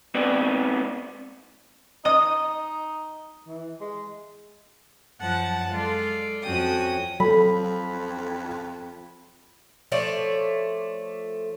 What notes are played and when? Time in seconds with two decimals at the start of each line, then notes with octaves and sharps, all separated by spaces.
0.14 G#3 B3 C4 B4 D5
2.05 D#4 D#5 D#6
3.48 E3
3.81 G#3
5.22 F#2 F3 F#5 A5 F#6
5.72 G#3 F4 A4 D5
6.43 F2 F3 C#4 F#4 G5 D#6
7.20 F2 F#3 A4 B5
9.92 F3 A3 C#5 D5